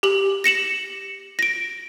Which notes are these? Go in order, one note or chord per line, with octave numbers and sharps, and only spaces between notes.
G4 F#7
A#6 C#7 E7 F#7
A#6 D7